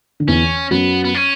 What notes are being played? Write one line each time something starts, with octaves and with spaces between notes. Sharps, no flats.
D3
E2 E3 C#4
F#2 F#3 B3
B3
C#4